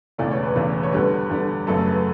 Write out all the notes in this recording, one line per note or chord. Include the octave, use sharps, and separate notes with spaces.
E1 E2 C#3 E3 A3 D5
C#5
B4
E1 E2 C#3 E3 A3
C#5
E2 D3 G3 B4
E2 D3 G3
F#2 C#3 F#3 A3 A4
B4